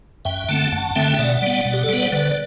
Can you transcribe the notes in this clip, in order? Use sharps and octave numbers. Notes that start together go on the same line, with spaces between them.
F#2 E5 G5
D3 A3 C4 F#5 A5
F#2 F#5 A5
D3 A3 C4 E5 G5
B2 D5 F#5
G3 B3
B2
G4
A4
G3 B3 B4
C5
D3 B4 D5